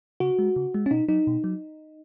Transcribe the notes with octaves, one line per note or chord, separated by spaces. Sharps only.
C#3 F#4
G#3
C#3
G#3
C#4
B2 D#4
F#3 D#4
B2
F#3